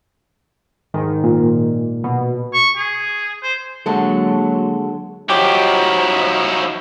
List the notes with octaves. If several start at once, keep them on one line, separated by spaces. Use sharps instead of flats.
G#2 D#3
A#2
B2
C#6
G#4
C5
D3 F#3 G#3 A#3 A4
F3 F#3 D#4 E4 G4